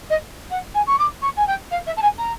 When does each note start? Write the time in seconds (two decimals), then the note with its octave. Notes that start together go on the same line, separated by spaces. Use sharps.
0.10 D#5
0.50 F#5
0.74 G#5
0.87 C#6
0.99 D6
1.22 C#6
1.37 G#5
1.47 G5
1.71 F5
1.86 E5
1.97 A5
2.02 G#5
2.18 A#5